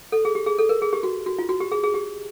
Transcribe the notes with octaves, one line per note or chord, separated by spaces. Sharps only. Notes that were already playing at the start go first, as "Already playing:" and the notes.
A4
G#4
G4
G#4
A4
A#4
G#4
G4
F#4
F#4
F4
F#4
G4
G#4
G#4
G4